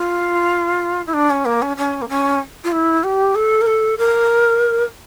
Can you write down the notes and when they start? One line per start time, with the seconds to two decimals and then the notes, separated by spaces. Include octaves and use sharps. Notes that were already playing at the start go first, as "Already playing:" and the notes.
Already playing: F4
1.06 E4
1.13 D4
1.30 C#4
1.45 A#3
1.62 C#4
1.77 C#4
2.01 A#3
2.09 C#4
2.64 F4
2.72 E4
3.03 G4
3.35 A4
3.61 A#4
3.66 A4
3.98 A#4